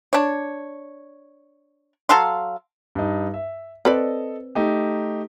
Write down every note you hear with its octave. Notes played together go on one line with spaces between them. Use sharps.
D4 C#5
F#3 A4 F5 C6
G2 D#4
E5
C4 A4 B4 D5 D#5
A3 D#4 G4